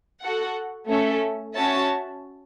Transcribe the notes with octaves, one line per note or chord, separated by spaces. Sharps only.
F#4 A4 F#5
A3 C#4 A4 E5
C#4 F#4 C#5 E5 A5